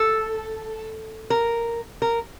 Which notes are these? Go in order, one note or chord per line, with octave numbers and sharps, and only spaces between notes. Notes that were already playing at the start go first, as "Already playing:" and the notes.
Already playing: A4
A#4
A#4